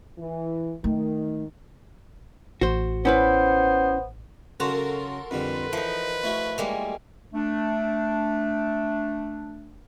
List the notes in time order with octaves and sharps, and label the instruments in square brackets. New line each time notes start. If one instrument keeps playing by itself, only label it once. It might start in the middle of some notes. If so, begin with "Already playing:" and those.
[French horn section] E3
[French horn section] D#3 [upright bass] A3
[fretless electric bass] A1 [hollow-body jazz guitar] F#4 C5
[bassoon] B3 [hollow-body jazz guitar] C#4 E4 B4 [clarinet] C5
[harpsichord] C#3 F#3 [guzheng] F#4 [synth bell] A4 A#4 C6
[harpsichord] F2 D3 G3 [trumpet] B4
[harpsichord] E3 [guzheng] F3 D#4
[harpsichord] A3 E4 F#4
[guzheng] G3 G#3 A#3
[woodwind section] A3 D4